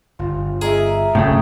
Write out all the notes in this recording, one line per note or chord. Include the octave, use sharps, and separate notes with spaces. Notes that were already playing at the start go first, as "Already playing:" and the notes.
G1 F4
G#4 A#4 D#5 E5
D#1 A#1 F#2 A2 C#3 A3 G5 D#6